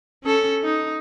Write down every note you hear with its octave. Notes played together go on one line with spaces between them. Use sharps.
C#4 A4
D#4